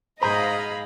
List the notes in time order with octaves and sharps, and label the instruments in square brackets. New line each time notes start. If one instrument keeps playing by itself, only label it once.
[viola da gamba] G#2 G#4 [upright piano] C5 A#5 G6 [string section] D#5 F5 [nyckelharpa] B5